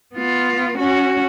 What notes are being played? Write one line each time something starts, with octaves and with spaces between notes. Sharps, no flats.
B3 F4
C#4 F#4